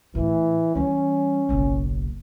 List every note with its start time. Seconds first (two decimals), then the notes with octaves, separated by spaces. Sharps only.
0.15 A2 E3
0.75 E3 G3 C#4
1.49 F#1 B1